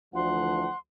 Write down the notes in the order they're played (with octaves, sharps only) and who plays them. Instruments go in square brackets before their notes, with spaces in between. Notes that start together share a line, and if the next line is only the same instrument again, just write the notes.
[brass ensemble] D2 E3 F3 [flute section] F#5 C6